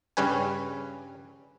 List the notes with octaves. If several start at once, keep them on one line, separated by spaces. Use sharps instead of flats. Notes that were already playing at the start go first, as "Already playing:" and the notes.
G2 C#3 G3 C#4 B4 G#5